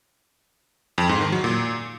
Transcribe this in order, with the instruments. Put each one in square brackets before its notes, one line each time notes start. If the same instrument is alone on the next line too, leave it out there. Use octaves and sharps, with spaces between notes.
[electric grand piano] F2
G#2
D#3
F#3
A#2